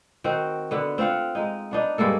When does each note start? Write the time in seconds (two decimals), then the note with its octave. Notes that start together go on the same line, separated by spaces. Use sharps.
0.24 D#3 C4 F#4
0.71 D3 B3
0.98 C4 F4 F5 F#5
1.35 G#3 D#4
1.71 B3 D4 D#4
1.98 G2 G#3 A#3 A4